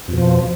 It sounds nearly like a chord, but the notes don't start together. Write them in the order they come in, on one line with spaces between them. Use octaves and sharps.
F2 B2 F3